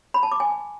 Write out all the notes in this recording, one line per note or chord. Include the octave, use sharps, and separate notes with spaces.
B5
A5
D6
G#5